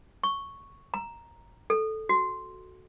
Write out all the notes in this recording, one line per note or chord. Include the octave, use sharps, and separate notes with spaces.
C#6
A#5
A4
F#4